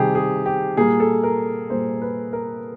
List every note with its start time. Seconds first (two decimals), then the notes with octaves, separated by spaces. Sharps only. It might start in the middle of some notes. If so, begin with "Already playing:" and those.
Already playing: C3 D#3 G3 G4 G#4
0.15 G#4
0.46 G4
0.77 A#2 G3 A#3 G#4
1.00 A4
1.23 A#4
1.70 A#2 G3 A#3 C5
2.01 B4
2.33 A#4